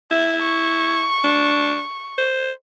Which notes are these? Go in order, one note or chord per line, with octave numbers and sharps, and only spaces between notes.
E4 E5
C#6
D4
C5